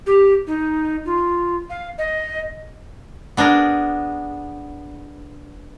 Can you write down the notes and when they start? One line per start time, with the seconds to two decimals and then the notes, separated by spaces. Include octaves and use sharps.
0.06 G4
0.47 D#4
1.05 F4
1.69 F5
1.98 D#5
3.37 B3 D4 G#4 A#4